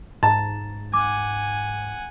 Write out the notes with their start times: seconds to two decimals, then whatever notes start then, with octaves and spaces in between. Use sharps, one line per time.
0.23 G#2 A5 A#5
0.94 F#5 G#5 D6